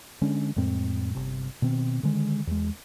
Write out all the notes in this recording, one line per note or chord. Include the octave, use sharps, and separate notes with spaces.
D3 G#3 C#4 D4
F2 A2 G#3 C4
G1 C3
B2 D#3 C4
D3 D#3 G#3
E2 G#3